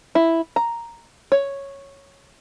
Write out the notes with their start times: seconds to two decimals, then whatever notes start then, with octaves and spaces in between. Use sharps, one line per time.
0.15 E4
0.56 A#5
1.32 C#5